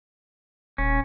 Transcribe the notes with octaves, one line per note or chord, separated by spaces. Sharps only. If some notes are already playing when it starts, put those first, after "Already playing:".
D#1 C#4